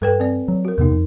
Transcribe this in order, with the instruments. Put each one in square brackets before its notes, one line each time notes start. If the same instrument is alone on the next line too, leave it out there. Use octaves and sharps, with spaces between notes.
[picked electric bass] G2 [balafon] A4 B4 G5
[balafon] C4 D5
[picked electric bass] F#3
[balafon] F#4 A#4
[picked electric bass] E2 C3 B3 [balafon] D#4 A#4
[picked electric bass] F2